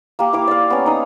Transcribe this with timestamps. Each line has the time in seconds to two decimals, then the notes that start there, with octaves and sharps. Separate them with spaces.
0.19 A#3 G4
0.33 E4 F5 D6
0.47 D5 F5
0.70 B3 C#4
0.86 D#4 D#6